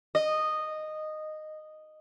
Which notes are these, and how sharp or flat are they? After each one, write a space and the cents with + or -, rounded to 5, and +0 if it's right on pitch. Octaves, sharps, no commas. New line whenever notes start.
D#5 -10